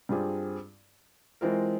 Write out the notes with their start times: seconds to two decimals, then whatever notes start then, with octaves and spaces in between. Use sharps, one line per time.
0.09 G2 G3 C4 F4 G#4
1.41 E3 G#3 C4 F4 A#4